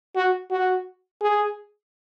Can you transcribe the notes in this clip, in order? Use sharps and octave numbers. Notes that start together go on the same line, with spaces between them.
F#4
F#4
G#4